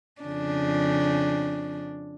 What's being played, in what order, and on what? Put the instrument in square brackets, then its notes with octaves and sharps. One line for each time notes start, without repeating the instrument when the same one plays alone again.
[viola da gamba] F2 C#3 D4